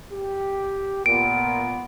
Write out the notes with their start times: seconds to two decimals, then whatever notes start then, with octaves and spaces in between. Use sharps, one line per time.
0.12 G4
1.06 A#2 B3 D7